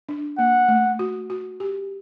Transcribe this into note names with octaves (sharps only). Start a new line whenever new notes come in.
D4
A#3 F#5
A3
F#4
F#4
G4